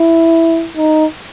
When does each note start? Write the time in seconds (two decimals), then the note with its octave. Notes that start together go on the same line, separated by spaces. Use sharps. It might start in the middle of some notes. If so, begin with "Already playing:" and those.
Already playing: E4
0.77 D#4